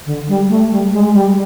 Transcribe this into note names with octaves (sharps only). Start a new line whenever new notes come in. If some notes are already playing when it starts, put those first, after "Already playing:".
D3
G3
A3
G3
G#3
G3